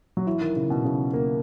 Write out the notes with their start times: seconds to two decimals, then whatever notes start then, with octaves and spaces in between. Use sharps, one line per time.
0.17 F#3
0.27 E3
0.41 D#3
0.56 C#3
0.70 B2
0.85 C#3
1.13 A#3